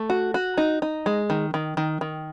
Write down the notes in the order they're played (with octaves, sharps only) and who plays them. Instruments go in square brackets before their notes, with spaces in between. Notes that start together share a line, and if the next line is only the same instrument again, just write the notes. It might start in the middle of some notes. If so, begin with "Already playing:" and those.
Already playing: [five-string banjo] A3
F#4
F#4
D#4
D#4
G#3
D#3
D#3
D#3
D#3